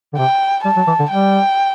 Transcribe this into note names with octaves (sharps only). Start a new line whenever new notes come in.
D3
C3 G5
G3 A5
F#3
E3
D3
G3 G5